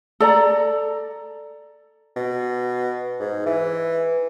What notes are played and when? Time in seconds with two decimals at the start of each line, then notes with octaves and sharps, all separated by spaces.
0.20 A4 D5 A#5
2.16 B2
3.20 G#2
3.46 E3